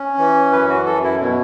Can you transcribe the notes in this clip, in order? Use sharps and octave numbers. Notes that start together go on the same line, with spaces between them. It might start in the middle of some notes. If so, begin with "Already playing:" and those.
Already playing: C#4
E3
F#2 B4
F#4
F#2 A4
E4
B2